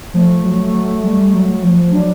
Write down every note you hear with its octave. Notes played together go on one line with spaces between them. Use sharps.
F3 A3
F#3
F#3
G3
F#3
F3
F#3 D4